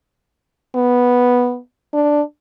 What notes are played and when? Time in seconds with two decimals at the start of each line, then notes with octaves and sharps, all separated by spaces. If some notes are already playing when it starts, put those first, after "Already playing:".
0.75 B3
1.94 D4